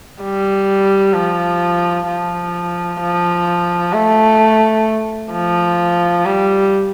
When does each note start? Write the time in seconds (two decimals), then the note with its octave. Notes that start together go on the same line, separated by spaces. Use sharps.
0.22 G3
1.14 F3
2.08 F3
3.01 F3
3.93 A3
5.32 F3
6.26 G3